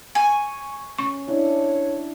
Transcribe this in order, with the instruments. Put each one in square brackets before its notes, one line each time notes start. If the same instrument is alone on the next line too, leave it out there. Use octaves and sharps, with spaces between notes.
[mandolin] G#5 [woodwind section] C#6
[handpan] C#4 [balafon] C#6
[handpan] D4 E4 [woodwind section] C#5